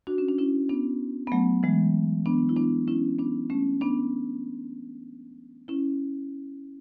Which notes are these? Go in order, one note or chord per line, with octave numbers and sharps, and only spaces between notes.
D4 F#4
C#4
D4
C#4 E4
B3 D4
B3
F#3 A3
E3 G#3
B3 D4
E4
B3 D4
C#4 E4
B3 D4
A3 C#4
B3 D4
C#4 E4